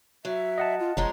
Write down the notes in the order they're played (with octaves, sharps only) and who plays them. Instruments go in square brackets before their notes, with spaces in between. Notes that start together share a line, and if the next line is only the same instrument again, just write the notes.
[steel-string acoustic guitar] F#3 [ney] E5
[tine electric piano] D#5 F#5 A5
[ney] F4
[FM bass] F1 [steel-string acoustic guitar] F3 G#3 C#4 [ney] A#5